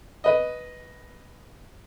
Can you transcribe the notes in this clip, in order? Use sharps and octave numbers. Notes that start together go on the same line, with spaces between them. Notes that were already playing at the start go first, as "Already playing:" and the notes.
B4 D#5